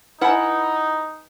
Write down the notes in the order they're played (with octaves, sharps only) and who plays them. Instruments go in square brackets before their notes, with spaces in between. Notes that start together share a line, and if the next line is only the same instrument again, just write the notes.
[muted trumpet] D#4 [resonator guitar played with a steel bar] E4 F#5 [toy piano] B4 D#5 G#5